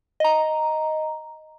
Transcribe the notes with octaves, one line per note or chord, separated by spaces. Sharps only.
D#5 A#5